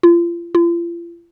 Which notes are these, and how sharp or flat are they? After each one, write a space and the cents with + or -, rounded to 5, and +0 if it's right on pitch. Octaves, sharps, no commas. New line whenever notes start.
F4 -35
F4 -40